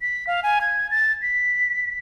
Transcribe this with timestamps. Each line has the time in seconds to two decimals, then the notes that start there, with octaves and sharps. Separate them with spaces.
0.01 B6
0.27 F5
0.43 G#5
0.61 G#6
0.91 A6
1.22 B6